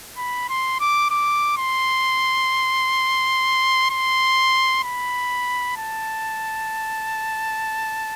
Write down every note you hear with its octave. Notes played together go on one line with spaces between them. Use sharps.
B5
C6
D6
D6
C6
C6
B5
A5